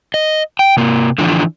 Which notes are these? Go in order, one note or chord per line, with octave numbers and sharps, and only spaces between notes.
D#5
G5
C3 A#3
D3 E3 F3 D4